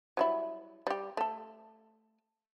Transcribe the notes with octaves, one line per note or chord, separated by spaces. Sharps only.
F#3 G3 E4
G3 G4
A3 A4